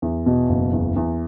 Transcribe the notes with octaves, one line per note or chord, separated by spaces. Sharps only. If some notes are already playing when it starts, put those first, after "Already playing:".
E2
B2
F#1
E2
E2